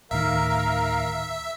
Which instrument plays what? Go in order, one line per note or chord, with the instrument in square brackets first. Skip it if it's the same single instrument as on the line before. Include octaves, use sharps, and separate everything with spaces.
[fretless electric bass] D1 A2 D#3 [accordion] A#4 F5 [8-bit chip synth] E5